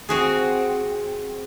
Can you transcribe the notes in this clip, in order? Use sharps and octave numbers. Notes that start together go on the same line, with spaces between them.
C4 F#4 G#4